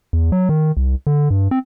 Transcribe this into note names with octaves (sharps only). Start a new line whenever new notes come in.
E2
F#3
D#3
C2
D3
G2
C4